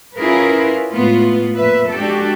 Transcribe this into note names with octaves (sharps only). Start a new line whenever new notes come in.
C#4 E4 F4 G#4 A#4 B4
A2 G#3 B3 F4
F2 A#2 B4 E5
G#3 D4 F#4 G4 A4